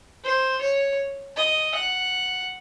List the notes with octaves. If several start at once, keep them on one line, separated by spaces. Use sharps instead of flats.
C5
C#5
D#5
F#5